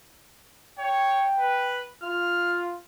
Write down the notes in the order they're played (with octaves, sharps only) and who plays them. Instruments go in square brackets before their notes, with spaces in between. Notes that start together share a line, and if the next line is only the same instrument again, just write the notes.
[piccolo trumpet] C#5 [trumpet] G5
[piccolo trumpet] B4
[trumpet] F4 [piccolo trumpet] F6